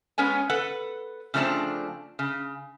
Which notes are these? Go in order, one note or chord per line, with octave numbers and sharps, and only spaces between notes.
G#3 B3 C#4 C#5 G#5
A4 B4 F#5
C#3 F3 A3 C4 D4 A5
C#3